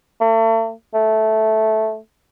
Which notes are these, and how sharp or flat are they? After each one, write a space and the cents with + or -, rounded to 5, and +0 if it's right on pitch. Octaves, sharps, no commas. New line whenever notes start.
A3 +40
A3 -10